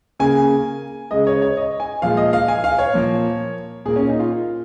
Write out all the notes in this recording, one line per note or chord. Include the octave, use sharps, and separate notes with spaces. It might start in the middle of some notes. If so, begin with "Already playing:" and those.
C#3 A#3 G#5
C#3 G#3 D#5
C#5
C#5
D#5
G#5
A#2 F3 G#3 F5
D#5
F5
G#5
F5
C#5
A#2 F3 A#3
A#2 A#3 G#4
C#4
D#4
F4